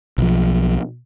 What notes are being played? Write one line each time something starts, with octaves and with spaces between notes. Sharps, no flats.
B1 F3